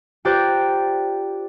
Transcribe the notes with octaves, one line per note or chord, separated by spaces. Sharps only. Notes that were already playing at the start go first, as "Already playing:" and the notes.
F4 G4 C5 D5 A#5 F#6